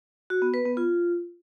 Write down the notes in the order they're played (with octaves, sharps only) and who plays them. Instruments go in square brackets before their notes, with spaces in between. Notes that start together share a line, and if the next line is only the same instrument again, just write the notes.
[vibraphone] F#4
B3
B4
B3
F4